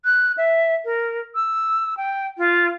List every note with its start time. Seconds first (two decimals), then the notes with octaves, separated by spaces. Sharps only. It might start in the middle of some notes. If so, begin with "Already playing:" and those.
0.05 F#6
0.38 E5
0.85 A#4
1.35 E6
1.97 G5
2.38 F4